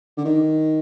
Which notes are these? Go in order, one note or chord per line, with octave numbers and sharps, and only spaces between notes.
D3
D#3